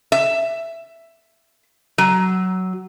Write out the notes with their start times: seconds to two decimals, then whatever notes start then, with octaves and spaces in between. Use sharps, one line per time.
0.12 E5
1.98 F#3